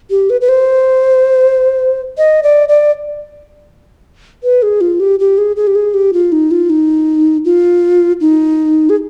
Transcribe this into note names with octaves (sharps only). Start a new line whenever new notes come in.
G4
B4
B4
C5
D#5
D5
D5
B4
G#4
F4
G4
G4
G#4
G#4
G4
G#4
G4
F4
D#4
F4
D#4
F4
D#4
G#4